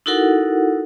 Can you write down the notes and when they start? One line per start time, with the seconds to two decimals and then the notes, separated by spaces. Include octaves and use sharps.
0.06 D#4 E4 F#4 A4 A#4 F#5